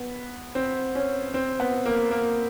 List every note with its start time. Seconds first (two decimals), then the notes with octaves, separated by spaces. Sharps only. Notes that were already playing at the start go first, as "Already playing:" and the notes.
Already playing: B3
0.55 C4
0.95 C#4
1.34 C4
1.60 B3
1.86 A#3
2.11 A#3